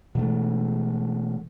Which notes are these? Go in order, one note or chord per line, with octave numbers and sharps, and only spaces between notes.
B2 E3 G#3 A3